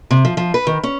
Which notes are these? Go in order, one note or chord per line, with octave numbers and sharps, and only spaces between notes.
C3
F3
F3
B4
D#3
C#4